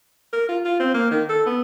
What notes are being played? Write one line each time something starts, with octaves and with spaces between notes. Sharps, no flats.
A#4
F4
F4
C4
A#3
D#3
A4
B3